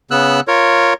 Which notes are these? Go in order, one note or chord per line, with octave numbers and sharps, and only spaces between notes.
C#3 B3 E6 F#6
F4 A#4 C#5